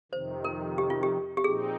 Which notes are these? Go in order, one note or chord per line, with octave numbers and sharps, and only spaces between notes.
F2 C3 D#3 C5
A#4
G4
F4
G4
G4
A#2 F3 C4 D#4 G#4